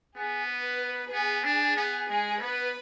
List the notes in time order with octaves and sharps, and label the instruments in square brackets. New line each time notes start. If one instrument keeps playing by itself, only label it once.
[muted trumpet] B3 [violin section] G#4
[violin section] B4
[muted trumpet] B3 [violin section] G#4
[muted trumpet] D4 [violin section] G#4
[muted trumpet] B3
[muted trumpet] G#3 [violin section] G#4
[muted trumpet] B3 [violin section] B4